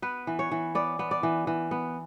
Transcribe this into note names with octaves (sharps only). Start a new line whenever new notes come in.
B3 B4
E3
C#5
E3
B3 D5
B3
D5
E3
E3
B3